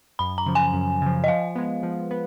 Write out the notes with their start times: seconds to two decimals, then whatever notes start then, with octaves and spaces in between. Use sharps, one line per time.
0.19 F#2 B5
0.38 A#5
0.46 C#3 F3
0.55 G#5
0.73 F#2
1.02 C#3 F3
1.24 D#5
1.28 F3 F5
1.55 G#3 B3
1.83 F3
2.11 B3